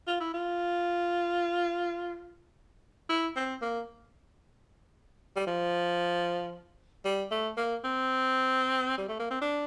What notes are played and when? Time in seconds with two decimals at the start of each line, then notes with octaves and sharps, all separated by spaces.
0.08 F4
0.20 E4
0.34 F4
3.09 E4
3.36 C4
3.62 A#3
5.36 G3
5.47 F3
7.05 G3
7.31 A3
7.57 A#3
7.84 C4
8.98 G3
9.09 A3
9.20 A#3
9.31 C4
9.42 D4